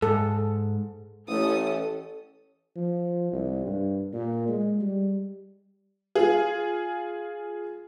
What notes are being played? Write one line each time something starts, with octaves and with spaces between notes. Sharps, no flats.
G#2 A4
A1 C#4 A4 D#6
F3
C2
G2
A#2
G#3
G3
F4 G#4